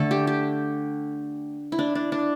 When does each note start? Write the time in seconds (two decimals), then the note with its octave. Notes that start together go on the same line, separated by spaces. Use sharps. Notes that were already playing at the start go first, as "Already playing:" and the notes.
Already playing: D3 A3 A4
0.11 G4
0.27 G4
1.72 E4
1.79 D4
1.95 D4
2.12 D4